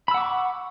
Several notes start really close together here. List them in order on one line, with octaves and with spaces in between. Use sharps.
B5 E6 F#5 D6 C#6